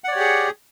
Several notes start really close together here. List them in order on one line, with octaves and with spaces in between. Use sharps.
F#5 D5 C#5 G4 G#4